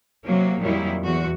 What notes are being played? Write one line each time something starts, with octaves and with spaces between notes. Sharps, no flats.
C3 F#3 A#3
F2 A#2 D#3 F#3 G3 E4
E2 F#4